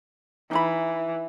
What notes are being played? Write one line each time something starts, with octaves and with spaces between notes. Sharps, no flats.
E3 D#4 E5 B5